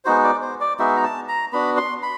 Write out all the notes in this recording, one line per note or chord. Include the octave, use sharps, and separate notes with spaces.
G#3 B3 D#4 F#4 C5
D5
C5
D5
G#3 B3 D#4 F#4 E5
A#5
A5
A#5
B3 D4 F#4 B5
C6
B5